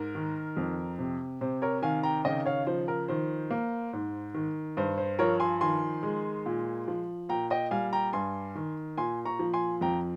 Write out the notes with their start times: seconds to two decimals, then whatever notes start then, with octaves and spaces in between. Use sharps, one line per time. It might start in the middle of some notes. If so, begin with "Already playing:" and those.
Already playing: G#2 A#4
0.15 D#3
0.57 F2
0.99 C3
1.41 C3 C5
1.62 A#4 C#5
1.82 D#3 F5 G#5
2.03 G5 A#5
2.24 C#3 D#5 G5
2.46 C#5 F5
2.67 F3 C5
2.88 A#4
3.08 D#3 C5
3.51 A#3
3.93 G#2
4.34 D#3
4.77 G2 C5
4.98 C5
5.19 F3 A#4 C#5
5.40 G#5 C6
5.61 D#3 G#5 C6
6.03 G#3
6.46 A#2
6.88 F3
7.29 A#2 G5 A#5
7.50 D#5 G5
7.71 G3 F5 G#5
7.93 G5 A#5
8.13 G2 G#5 C6
8.55 D#3
8.97 A#2 G#5 C6
9.26 A#5 C#6
9.39 F3
9.54 G#5 C6
9.81 F2 G5 A#5